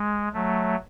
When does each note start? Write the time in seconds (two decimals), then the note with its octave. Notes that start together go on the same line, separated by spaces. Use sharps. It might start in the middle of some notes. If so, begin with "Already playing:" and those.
Already playing: G#3
0.33 F#3 A3